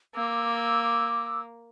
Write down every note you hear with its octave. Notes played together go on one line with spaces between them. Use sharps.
A#3 D6 E6